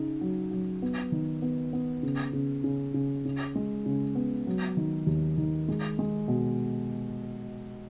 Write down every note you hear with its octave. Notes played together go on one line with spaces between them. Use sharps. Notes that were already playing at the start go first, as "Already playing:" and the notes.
Already playing: C#3 D#4
F#3
F#3
B3
D#3
B3
B3
C#3
C#3
C#3
C#3
C#3
G#3
C#3
B3
F#3
D#3
D#2
D#3
G#3
G#3
B2